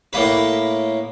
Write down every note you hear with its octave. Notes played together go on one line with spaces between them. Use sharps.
A2 A#3 B4